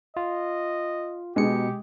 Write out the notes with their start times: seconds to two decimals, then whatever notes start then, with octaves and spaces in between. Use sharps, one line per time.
0.17 F4 D#5
1.36 B2 G#3 G4 C#7